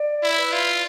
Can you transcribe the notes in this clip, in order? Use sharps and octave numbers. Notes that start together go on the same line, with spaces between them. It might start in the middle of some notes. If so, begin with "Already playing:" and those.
Already playing: D5
E4
B4
F4